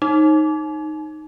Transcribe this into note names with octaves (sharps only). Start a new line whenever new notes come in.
D#4